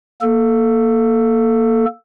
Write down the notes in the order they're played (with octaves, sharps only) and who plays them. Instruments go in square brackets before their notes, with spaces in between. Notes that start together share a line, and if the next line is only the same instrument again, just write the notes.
[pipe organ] A#3 A4